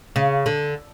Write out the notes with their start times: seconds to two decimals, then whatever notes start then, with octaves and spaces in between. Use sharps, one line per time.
0.16 C#3
0.46 D3